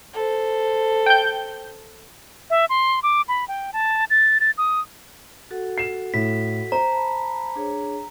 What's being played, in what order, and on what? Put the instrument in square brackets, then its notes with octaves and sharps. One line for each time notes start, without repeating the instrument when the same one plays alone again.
[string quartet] A4 C5
[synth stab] G5 G6
[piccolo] E5
C6
D6
B5
G5
A5
A6
A6
D#6
[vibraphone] F#4 A4 F#5
[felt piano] C7 E7
[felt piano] A2 [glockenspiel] B6
[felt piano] C5 [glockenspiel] A#5
[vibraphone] A5 B5
D4 G#4 C#5